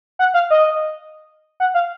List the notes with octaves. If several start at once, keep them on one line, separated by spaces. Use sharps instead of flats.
F#5
F5
D#5
F#5
F5